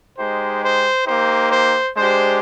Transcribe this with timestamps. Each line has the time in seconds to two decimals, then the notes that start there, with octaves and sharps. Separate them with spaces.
0.18 G#3 D#4 G4 C5
0.63 C5
1.07 A#3 D#4 G4 C5
1.52 C5
1.96 G#3 D4 G4 C5